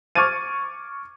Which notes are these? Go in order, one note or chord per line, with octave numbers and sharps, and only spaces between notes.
C#6 D6 F6 G#6 A6 D#7